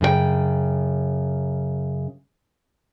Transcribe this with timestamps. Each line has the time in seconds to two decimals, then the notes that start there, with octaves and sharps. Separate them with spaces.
0.01 F#2 C#3 G#4 G5